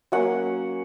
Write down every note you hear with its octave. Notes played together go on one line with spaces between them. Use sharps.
F#3 A#3 C#4 F#5